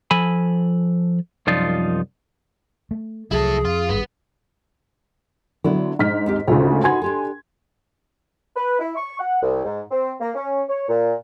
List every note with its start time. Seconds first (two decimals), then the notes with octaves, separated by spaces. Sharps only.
0.11 F3 A4 G#5 B5
1.47 C2 F#2 F3 D#4 F4 D5
2.91 A3
3.31 C2 F3 F#3 E4 G#4 A4
3.65 F2 F4
3.89 G#1 G2 B3
5.64 D3 F#3 B3 E4
5.99 G#2 D4 F6 B6
6.26 D#2 C4 G4
6.48 D2 G#2 C#3 F4
6.84 D#4 F#4 B4 G#5 C6 G#6
7.02 D4 G4 A4
8.56 B4
8.79 E4
8.96 C#6
9.19 F#5
9.43 C2
9.65 G#2
9.91 C4
10.20 A#3
10.35 C#4
10.69 C#5
10.89 A#2